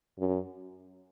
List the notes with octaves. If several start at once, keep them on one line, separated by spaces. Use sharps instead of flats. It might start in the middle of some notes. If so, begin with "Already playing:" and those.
F#2